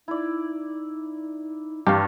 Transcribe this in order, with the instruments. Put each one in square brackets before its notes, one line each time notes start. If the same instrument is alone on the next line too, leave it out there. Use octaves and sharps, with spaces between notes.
[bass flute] D#4 [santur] E4 D5
[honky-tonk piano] G2 [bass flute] E3 [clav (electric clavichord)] G4 F5 [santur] A#4